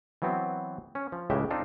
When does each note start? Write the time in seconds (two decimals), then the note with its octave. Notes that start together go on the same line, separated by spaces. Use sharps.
0.22 E3 F#3 B3 C4
0.95 C#4
1.12 F3
1.30 C#2 A2 C#3 G#3 G4 E5
1.51 C4 D4 D#4 F4 A4